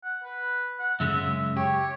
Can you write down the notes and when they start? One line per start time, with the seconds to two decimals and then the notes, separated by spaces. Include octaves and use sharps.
0.04 F#5
0.24 B4
0.79 F#5
1.00 F#2 C#3 G#3 E5
1.57 G4 C#5